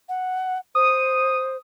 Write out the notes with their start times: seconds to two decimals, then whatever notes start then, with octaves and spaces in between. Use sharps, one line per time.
0.09 F#5
0.75 C5 D#6